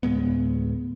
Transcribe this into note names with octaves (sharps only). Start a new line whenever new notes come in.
D2 A2 G#3 B3